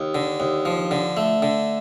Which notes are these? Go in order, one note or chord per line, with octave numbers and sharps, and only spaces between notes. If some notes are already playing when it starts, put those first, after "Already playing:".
Already playing: D#2
D3
D#2
F3
D3
A3
D3